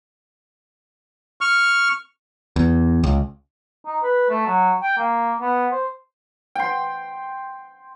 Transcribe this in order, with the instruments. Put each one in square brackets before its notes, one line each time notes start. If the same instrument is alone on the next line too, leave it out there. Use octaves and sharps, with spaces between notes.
[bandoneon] C#6 F6
[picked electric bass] E2
C#2
[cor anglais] D#4
B4
A3
F#3
G5
A#3
B3
C5
[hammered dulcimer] G5 C6